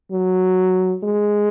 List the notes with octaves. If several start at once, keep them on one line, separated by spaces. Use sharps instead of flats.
F#3
G#3